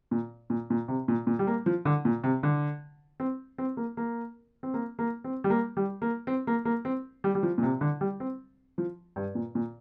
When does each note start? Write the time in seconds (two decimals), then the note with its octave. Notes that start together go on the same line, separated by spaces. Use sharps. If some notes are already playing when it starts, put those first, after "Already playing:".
0.11 A#2
0.50 A#2
0.70 A#2
0.88 C3
1.08 A#2
1.27 A#2
1.39 G3
1.47 A#3
1.66 F3
1.85 D3
2.05 A#2
2.24 C3
2.43 D3
3.20 C4
3.58 C4
3.77 A#3
3.97 A#3
4.63 C4
4.74 A#3
4.99 A#3
5.24 C4
5.44 G3
5.50 A#3
5.77 G3
6.02 A#3
6.27 C4
6.47 A#3
6.65 A#3
6.85 C4
7.24 G3
7.35 G3
7.43 F3
7.58 A#2
7.63 C3
7.81 D3
8.01 G3
8.20 C4
8.78 F3
9.16 G2
9.35 A#2
9.55 A#2